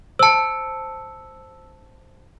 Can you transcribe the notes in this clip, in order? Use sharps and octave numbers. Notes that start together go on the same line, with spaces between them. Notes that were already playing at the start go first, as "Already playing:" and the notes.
C5 A5 E6 C#7